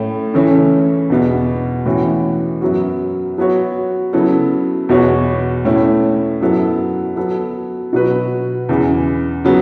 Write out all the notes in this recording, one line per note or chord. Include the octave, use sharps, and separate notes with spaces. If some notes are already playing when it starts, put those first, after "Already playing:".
Already playing: A2 A3 C#4
C#3 E3 A3 C#4 E4
E2 B2 B3
A2 E3 C#4 F#4
F#2 F#3 B3 F#4
F#3 B3 F#4 C#5
C#3 F#3 B3 E4 A4
E2 B2 B3 F#4 C#5
A2 A3 C#4 E4
F#2 F#3 B3 E4 A4
F#3 B3 A4
B2 F#3 B3 F#4 B4
E2 C#3 E3
C#3 F#3 B3